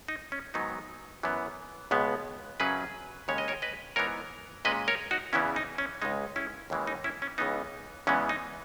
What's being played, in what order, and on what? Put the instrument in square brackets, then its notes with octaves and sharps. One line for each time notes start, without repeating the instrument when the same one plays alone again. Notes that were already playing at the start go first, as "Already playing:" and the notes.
[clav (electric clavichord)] D#4
C#4
G#2 D#3 F#3 B3 D#4
F#2 E3 B3
C#2 B2 G#3 B3
F#2 C#3 F#3 C#4 G#4 B4
D#2 C#3 G#3 C#4 C#5
D#5
A#4 C#5
B4 D#5
G#2 E3 B3 A#4 C#5
A#2 G#3 C#4 B4 D#5
A#4 C#5
D#4 F#4
E2 C#3 E3 B3 C#4 E4
D#4
C#4
C#2 C#3 G#3 D#4
C#4 E4
D#2 C#3 E3 G#3
D#4
C#4 E4
C#4
C#2 C#3 E3 B3 D#4
E2 C#3 E3 G#3 B3 C#4
D#4